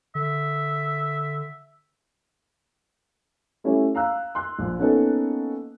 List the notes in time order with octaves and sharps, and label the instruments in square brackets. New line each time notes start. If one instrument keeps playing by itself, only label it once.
[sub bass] D3 [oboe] E5
[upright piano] G3 A3 C#4 E4
F5 A#5 E6 F#6
C6 F#6
A#1
A#3 B3 C#4 D#4 A4